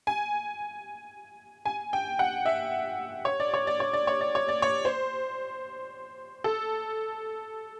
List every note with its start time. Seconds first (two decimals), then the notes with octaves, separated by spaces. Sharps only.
0.07 G#5
1.65 G#5
1.93 G5
2.19 F#5
2.46 E5
3.25 C#5
3.40 D5
3.54 C#5
3.67 D5
3.80 C#5
3.93 D5
4.07 C#5
4.21 D5
4.35 C#5
4.48 D5
4.62 C#5
4.85 C5
6.44 A4